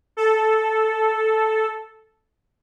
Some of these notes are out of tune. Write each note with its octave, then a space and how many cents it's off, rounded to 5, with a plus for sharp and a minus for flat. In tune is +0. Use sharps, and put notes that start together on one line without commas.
A4 -5